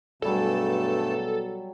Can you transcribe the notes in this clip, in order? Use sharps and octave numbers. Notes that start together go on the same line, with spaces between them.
G2 B2 F#3 G3 A3 G#4 A4 A5